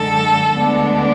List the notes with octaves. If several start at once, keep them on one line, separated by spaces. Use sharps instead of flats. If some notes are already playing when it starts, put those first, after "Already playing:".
Already playing: F#2 D3 G#3 A4
D2 D3 G#3 B3 D4